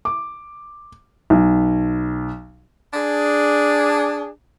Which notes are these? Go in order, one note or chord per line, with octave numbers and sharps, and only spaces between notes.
D6
B1
D4 G#4